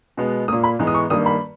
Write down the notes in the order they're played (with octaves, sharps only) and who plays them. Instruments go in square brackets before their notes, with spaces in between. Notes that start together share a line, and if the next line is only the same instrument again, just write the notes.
[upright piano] B2 G#3 B3
A#2 A#3 D#6
B5
G#2 E3 G#3 B3
D#6
C#6
G2 D#3 G3 A#3 D#6
B5